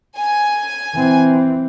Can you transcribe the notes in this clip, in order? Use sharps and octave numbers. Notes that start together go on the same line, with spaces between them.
G#5
E3 C4